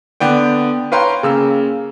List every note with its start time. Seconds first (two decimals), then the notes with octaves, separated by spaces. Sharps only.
0.20 D3 B3 D5 G5
0.92 B4 C#5 F5 G5 A#5 C6
1.23 C#3 A#3 E6